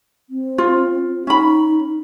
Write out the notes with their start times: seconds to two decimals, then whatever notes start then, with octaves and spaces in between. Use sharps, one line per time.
0.30 C4
0.58 F4
1.27 C#4 D#4 B5